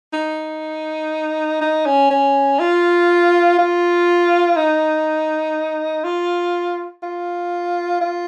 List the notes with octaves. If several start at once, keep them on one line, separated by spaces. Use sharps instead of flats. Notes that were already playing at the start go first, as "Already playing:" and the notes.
D#4
D#4
C#4
C#4
F4
F4
D#4
F4
F4
F4